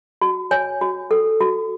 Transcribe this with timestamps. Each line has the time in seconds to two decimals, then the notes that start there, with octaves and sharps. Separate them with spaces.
0.22 F#4
0.51 C#5 G#5
0.81 F#4
1.11 A4
1.41 F#4